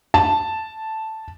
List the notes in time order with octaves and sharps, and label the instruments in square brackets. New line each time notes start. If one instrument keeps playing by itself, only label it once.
[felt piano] A5